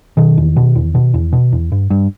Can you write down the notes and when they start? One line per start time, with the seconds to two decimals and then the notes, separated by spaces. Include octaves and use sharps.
0.17 B2 D#3
0.38 E2
0.56 B2
0.76 E2
0.95 B2
1.14 E2
1.33 B2
1.52 E2
1.72 G2
1.90 G2